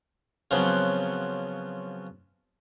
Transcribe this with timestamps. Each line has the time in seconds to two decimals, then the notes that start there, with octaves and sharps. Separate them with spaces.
0.51 C#3 F3 F#3 B3 C4